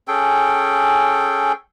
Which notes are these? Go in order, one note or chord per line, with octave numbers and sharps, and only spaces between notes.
C#4 G#4 A4 G5